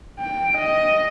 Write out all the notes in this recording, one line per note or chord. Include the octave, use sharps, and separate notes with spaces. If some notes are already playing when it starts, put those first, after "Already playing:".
G5
D#5